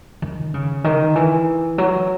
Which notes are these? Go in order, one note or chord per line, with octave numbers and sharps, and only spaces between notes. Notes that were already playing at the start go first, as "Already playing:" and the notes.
D#3
C#3
D#3
E3
F#3